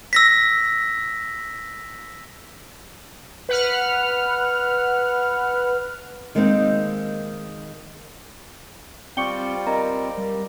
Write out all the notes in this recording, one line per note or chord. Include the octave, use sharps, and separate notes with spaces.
E6 A#6 B6
B4 F#5 F6
D#3 G#3 A#3 C4 D#4
G3 C4 F4 D5 G5 C#6 C#7 G7
C4 A#4 D#5 A#5
G3